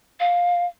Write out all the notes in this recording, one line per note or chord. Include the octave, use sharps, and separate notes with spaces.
F5